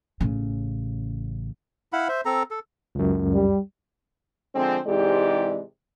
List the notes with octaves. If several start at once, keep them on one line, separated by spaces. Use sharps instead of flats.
A1 C#3
E4 F5 F#5 B5
C5 E5
C4 A4 A#5
A4
C#2 F#2
G3
D3 F3 G#3 C4
G#2 C3 E3 G#3 G4 D5